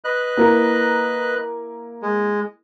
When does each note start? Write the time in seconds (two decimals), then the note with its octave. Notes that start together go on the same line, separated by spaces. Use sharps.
0.04 B4 D#5 F#6
0.37 A#3 E4 A#4
2.02 G#3